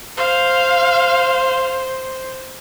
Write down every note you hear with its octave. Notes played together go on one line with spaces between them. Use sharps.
C5 F5